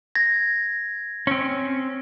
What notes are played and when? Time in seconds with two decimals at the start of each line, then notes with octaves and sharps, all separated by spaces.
0.15 G#6 A#6
1.27 C4 C#4